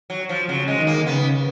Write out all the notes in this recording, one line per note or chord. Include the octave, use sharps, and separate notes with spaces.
F#3
F3
C#3 F#3
G#3
D#3
A#3
C#3 B3